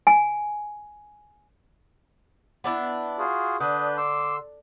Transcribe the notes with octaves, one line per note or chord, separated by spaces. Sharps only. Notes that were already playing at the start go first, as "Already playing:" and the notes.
G#5
B3 D4 E4
F4 F#4 G#4
D3 D4 B4 D#6 G6
C6 D6 E6